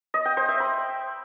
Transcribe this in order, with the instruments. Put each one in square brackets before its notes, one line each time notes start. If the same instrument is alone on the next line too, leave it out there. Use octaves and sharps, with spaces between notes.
[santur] D#5
G5
C5
E5
B5